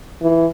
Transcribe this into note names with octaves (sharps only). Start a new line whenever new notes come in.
E3